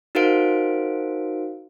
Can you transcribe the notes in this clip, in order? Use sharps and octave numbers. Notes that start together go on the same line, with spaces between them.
D#4 F#4 A#4 C5 F5 D7